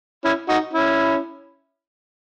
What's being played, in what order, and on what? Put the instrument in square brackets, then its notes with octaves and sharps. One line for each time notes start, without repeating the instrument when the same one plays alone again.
[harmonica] C#4 E4
D#4 F#4
C#4 E4